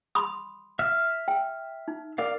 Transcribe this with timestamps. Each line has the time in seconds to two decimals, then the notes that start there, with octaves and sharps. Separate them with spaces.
0.15 B5 C6 D#6
0.79 E5 F6
1.28 G5
1.88 D#4
2.18 A#4 D5 F5